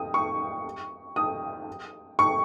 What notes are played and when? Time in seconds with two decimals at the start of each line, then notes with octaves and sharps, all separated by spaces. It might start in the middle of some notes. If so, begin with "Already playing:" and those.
Already playing: D#6
0.14 C#6
1.16 D#6
2.19 C#6